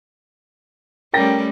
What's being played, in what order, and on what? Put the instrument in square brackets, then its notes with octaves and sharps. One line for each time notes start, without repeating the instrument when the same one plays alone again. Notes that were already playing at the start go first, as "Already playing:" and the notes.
[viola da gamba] G3 A3 C#4 [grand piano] A#4 G5 A#6